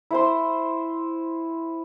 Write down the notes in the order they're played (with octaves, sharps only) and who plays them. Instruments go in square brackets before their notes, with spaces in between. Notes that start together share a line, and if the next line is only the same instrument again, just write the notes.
[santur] E4 C5 C6